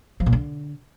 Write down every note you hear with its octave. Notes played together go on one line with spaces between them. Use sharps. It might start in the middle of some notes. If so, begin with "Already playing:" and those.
F3
A#2
D3